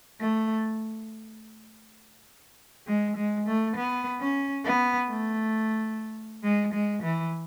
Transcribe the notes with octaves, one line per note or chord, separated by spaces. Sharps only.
A3
G#3
G#3
A3
B3
C#4
B3
A3
G#3
G#3
E3